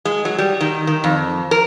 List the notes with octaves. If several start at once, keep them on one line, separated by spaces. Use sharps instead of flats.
G#3
F#3
G3
D#3
D#3
F2
A#4